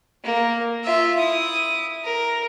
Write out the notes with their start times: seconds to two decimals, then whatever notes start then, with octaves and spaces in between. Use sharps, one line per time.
0.24 A#3
0.84 F4 E5
1.19 E4 D#6
2.04 A#4